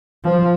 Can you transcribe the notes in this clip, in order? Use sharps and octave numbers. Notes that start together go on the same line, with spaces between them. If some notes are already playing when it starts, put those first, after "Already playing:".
F3